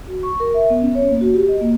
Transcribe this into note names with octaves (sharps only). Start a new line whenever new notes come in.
F#4
C#6
A#4
E5
B3
C#4
C#5
A#3
F#4
G4
D#5
A#3